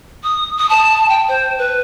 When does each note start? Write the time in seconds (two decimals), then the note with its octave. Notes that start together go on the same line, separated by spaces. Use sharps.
0.23 D#6
0.57 D#6
0.69 A5
1.09 G5
1.28 C5
1.58 B4